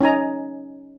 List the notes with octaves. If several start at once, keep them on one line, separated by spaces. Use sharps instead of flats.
C#4 D#4 G#5 A#5